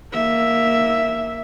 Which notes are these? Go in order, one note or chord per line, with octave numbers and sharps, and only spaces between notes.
A#3 E5